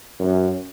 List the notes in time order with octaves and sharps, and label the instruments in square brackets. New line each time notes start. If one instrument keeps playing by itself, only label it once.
[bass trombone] F#2